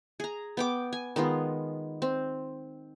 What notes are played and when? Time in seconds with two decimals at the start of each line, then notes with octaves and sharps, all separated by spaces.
0.20 G#4 A#5
0.57 B3 G5 D6
0.93 G#5
1.16 D#3 G#3 B3 F4
2.02 C4